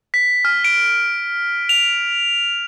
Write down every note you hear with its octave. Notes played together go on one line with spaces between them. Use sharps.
B6
F6
D7
F7